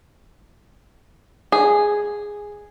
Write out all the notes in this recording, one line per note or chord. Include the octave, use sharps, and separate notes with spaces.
G#4